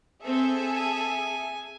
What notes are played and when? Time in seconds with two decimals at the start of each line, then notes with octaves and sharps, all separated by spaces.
0.24 C4 G#4 A4 E5
0.73 G#5